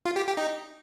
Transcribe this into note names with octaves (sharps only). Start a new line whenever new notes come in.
F4
G4
G4
D#4